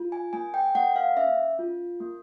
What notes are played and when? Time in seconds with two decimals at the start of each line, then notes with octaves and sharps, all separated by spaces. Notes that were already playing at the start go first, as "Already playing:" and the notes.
Already playing: F4
0.12 G#5
0.33 A#3 G#5
0.54 G5
0.75 A#3 F#5
0.96 F5
1.16 C#4 E5
1.59 F4
2.00 A#3